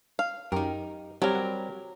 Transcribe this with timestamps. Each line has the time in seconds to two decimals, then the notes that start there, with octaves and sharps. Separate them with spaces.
0.19 F5
0.52 F#2 D#4 G4 A#4
1.22 F#3 G3 C4 G4 A#4 G#6
1.35 F#4